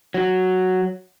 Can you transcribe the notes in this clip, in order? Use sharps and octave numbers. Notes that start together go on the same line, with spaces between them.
F#3